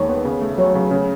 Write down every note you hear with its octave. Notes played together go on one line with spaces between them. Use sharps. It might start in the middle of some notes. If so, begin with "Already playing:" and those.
Already playing: D#2 D#3 G#3 C#5
B3
C#3
A3
F#3 C#5
C#3
C#3